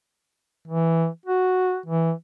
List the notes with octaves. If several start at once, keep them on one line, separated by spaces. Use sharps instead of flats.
E3
F#4
E3